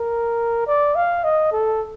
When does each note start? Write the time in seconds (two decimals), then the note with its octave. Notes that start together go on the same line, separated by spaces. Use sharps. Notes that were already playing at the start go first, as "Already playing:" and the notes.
Already playing: A#4
0.67 D5
0.95 F5
1.24 D#5
1.52 A4